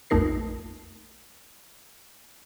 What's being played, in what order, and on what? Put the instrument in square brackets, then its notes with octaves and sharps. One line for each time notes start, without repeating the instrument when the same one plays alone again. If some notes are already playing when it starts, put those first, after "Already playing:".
[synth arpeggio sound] A#1 F2 A3 D#4 A#4 C7